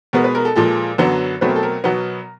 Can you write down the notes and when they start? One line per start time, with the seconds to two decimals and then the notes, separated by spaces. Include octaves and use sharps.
0.13 B2 G#3 B3 A#4
0.24 B4
0.35 A#4
0.45 A4
0.56 A#2 F3 G#3 A4
0.98 F#2 D3 F#3 B3
1.41 B2 F#3 A3 C4 B4
1.49 A#4
1.56 A4
1.63 A#4
1.84 B2 F#3 B3